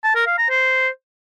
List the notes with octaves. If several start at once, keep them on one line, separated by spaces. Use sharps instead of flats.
A5
A#4
F5
A#5
C5